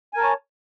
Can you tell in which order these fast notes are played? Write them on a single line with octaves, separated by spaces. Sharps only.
G#5 A#4 A5 C#5